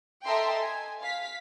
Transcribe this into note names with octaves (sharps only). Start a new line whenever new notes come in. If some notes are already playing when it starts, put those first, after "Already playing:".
A4 D#5 E5 G5 A#5 C6
G#5
F5 B6